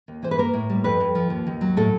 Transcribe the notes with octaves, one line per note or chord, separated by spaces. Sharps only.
D#2
E3 C5
B4
A#3 A#4
A2
G3
F2 B4
F2
F3
D#2
D#2
F#3
A2 A4